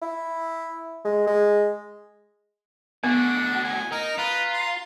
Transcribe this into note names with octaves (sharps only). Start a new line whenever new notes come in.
E4
G#3
G#3
A2 B3 D4 F#4
G#5
D#4 A#4
F4 B4 A#5
C6